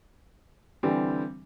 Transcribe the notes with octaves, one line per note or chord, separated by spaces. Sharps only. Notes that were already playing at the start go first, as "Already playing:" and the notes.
D3 E3 G3 C4